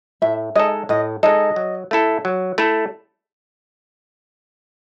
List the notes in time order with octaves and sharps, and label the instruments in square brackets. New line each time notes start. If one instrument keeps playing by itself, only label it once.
[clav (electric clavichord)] A2 [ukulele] E5
[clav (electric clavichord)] G#3 D#4 A4 [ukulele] D#5
[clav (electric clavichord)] A2 [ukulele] D#5
[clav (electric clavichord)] G#3 D#4 A4 [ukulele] D#5
[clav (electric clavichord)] F#3
A3 E4 A4
F#3
A3 E4 A4